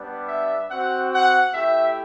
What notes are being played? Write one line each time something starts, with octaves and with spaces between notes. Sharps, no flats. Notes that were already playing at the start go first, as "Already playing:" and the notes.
Already playing: G3 B3 D4
E5
C4 F#4 F#5
F#5
A3 E4 G4 E5